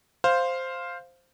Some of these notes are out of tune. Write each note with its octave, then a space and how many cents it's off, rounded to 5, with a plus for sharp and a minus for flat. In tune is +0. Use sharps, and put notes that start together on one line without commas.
C5 +0 F5 +0